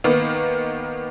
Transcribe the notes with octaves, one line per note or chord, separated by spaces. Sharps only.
D#3 A#3 B3